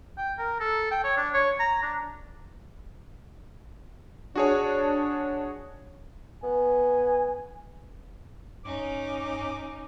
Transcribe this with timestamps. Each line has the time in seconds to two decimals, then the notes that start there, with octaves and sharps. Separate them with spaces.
0.17 G5
0.38 A#4
0.60 A4
0.91 G5
1.04 C#5
1.17 D4
1.34 C#5
1.59 A#5
1.82 D4
4.35 D4 F#4 G#4 C#5
6.43 B3 G#5
8.65 G2 C#4 D#4 D6